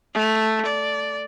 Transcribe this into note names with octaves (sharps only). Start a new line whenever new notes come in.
A3
D5